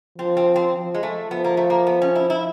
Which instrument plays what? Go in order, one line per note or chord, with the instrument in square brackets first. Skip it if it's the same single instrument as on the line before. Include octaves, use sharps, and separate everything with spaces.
[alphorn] F3 [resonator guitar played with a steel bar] C4
[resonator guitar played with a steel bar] C4
C4
[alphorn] F3
[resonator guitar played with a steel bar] G#3
A3
[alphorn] F3 [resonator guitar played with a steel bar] B3
[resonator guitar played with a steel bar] A#3
A3
A#3
B3
C#4
E4
E4